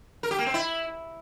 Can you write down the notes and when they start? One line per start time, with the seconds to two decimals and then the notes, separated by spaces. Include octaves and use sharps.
0.23 A#4
0.31 G4
0.39 A#3
0.46 C4
0.54 E4